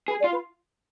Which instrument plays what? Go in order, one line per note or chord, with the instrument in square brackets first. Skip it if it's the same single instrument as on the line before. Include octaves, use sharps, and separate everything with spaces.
[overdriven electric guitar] G#4 [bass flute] B4
[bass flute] D5
[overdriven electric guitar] F4
[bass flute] B4